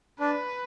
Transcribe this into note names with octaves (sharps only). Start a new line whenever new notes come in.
D4 B4